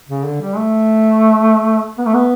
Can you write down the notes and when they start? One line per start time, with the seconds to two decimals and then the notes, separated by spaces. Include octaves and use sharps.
0.09 C#3
0.25 D3
0.41 G3
0.56 A3
1.98 B3
2.06 A3
2.14 B3